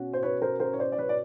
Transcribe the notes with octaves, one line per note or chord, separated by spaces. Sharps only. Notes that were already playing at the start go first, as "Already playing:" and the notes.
Already playing: B2 C#4 F#4
C5
B4 C#5
A#4 C5
A#4 C5
C#5
C5 D5
D5
B4 C#5
D5